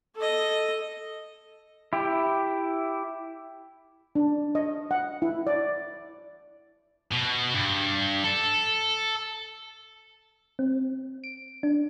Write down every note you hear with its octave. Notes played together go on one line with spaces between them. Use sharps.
A4 D#5
E4 G4
D4
D#5
F#5
E4
D5
B2
G2
A4
C4
D7
D4